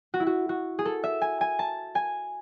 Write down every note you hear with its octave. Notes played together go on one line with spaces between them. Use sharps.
F#4
E4
F#4
F#4
G#4
A4
E5
G#5
G#5
A5
G#5